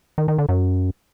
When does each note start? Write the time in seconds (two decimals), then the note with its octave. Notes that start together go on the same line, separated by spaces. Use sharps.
0.18 D#3
0.28 D#3
0.38 D3
0.49 F#2